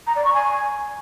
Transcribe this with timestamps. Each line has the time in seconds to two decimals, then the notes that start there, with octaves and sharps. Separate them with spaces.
0.07 A#5
0.16 D5
0.25 C#6
0.34 G#5